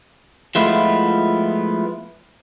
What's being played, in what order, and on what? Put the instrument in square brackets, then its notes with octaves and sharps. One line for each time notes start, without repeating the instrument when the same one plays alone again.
[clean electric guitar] F3 G#3 A3 B3 E4 F4